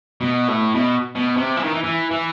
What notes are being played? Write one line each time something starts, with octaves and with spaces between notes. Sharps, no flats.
B2
A2
B2
B2
C3
E3
D#3
E3
E3
E3